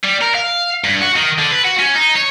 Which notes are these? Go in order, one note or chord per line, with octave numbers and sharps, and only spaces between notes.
G3
A#4
F5
G2
F#4
D#3
D3
B4
F#4
C#4
D#4
C#5